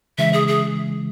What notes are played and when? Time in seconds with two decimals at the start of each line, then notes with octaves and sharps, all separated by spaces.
0.18 C#3 E3 G#3 E5
0.33 G#4
0.48 G#4